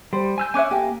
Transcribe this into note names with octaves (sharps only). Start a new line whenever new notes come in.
G3 C5
G#5 E6 G6
C#4 C#5 E5 G#5 D6 F#6
A#3 G4 G#5